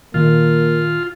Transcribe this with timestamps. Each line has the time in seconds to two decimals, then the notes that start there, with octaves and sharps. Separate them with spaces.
0.14 A#2 D#3 A#3 F4